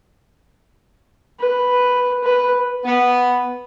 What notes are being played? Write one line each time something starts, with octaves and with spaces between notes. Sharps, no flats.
B4
B4
B3